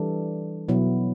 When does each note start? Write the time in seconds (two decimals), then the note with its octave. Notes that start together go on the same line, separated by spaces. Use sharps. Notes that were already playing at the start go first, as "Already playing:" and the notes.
Already playing: E3 G3 D4 A4
0.69 B2 F#3 B3 E4